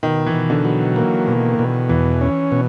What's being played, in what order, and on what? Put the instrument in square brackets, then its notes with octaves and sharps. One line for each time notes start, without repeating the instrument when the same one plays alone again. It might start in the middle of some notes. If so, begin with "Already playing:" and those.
[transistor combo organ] B2 [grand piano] D#3
[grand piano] E3
[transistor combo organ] B2
[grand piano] D3
[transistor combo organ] F#3
A#3
B2
B2
[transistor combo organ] E2 [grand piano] E3
[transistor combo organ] C#4
B2